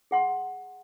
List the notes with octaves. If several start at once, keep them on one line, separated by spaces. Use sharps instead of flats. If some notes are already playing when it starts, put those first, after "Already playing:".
G#4 F#5 C6